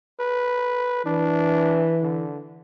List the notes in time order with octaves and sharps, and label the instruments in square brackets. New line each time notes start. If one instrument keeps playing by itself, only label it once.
[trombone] B4
[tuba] E3 [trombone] D4
[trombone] D3